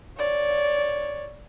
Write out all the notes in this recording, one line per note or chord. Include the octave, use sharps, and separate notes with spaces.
C#5 D5